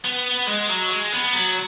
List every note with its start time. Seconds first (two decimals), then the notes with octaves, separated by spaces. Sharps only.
0.05 B3
0.47 G#3
0.69 F#3
0.90 G#3
1.12 B3
1.33 F#3